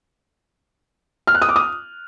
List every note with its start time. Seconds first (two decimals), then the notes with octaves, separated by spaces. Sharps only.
1.27 F6
1.35 F#6
1.42 D#6
1.49 D6
1.56 D#6